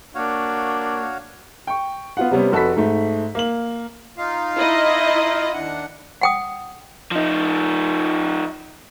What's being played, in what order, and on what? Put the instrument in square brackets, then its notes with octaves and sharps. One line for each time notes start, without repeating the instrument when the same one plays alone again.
[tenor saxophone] A#3 [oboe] D4 [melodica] F#4 C#5 F5
[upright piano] G5 C#6
B3 F4 F#5
C3 G3 B3 C#4
F1 F#4 A4 B4 B6
G#2 A3
A#3 F#7
[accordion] D#4 F4 F5
[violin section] E4 D#5
[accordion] D#2 D4 F#5
[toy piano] F#5 G5 D#6
[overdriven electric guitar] F3 D#4